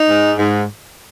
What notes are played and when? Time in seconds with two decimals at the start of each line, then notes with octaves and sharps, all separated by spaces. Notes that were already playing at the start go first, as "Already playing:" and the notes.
Already playing: D#4
0.10 G#2
0.39 G#2